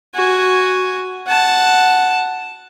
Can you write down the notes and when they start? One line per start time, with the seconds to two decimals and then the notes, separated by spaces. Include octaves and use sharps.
0.15 F#4 G#5
1.27 F#5 A5